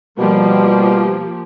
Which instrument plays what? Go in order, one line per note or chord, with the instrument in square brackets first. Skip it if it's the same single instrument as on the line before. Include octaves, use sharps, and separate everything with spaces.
[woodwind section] B2 G3 [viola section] F3 A#3 G4